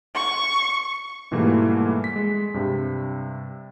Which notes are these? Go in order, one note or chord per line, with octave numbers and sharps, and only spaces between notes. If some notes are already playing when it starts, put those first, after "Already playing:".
C#6
G#2 B2 E3 G3 A3 A#3
B6
G#3
G2 C3